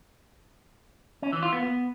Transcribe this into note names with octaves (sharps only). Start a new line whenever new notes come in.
C#4
E3
F4
B3
B3